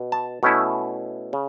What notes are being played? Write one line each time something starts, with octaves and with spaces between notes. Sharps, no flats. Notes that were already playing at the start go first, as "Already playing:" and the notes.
Already playing: B2
A5
B2 A3 C#4 E4
C#3